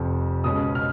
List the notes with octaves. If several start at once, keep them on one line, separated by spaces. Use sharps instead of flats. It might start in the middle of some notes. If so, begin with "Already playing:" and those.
Already playing: F1 F2 F3
C#2 B2 G#3 C#4 D#6
F6